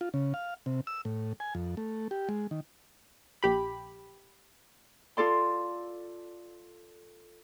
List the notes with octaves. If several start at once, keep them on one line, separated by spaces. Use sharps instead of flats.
F4
C#3
F5
C3
E6
A2
G#5
F2
A3
G4
G#3
D#3
A#1 G4 B5
F4 A4 D5 C6